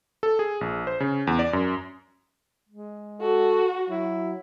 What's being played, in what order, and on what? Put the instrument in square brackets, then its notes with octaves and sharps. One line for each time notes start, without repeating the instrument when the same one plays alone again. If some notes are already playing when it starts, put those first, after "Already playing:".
[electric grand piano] A4
G#4
A#1
C5
C#3
E2
D5
F#2
[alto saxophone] G#3
[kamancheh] F#4 [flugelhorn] A4
[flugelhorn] F#3 [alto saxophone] E4